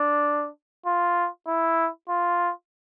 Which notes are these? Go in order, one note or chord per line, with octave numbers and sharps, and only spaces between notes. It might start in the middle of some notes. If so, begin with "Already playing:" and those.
Already playing: D4
F4
E4
F4